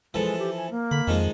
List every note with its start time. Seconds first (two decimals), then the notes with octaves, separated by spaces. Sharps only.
0.14 E3 F3 G#3 A4
0.39 G4
0.57 G#5
0.71 A#3
0.91 D3 B5
1.07 F2 D#3 F3 G#3